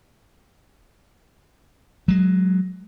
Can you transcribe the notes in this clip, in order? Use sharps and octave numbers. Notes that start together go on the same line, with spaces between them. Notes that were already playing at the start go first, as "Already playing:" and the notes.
F#3 G#3